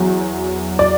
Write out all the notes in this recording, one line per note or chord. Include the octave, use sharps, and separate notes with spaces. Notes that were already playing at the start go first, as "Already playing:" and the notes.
Already playing: E2 F#3
D5